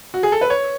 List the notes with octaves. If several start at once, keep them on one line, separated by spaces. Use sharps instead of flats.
F#4
G#4
A4
B4
C#5